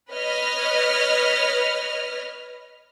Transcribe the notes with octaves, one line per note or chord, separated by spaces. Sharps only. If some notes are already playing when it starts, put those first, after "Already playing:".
B4 C#5 D#5 F6